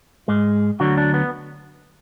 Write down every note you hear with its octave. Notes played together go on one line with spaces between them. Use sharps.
G#2 G#3
D2 D3 F#3 F#4
D4
B3